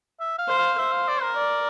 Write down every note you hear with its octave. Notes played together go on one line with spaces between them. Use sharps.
E5
F5
C5
F5
C5 E5
F5
D5
A#4
D5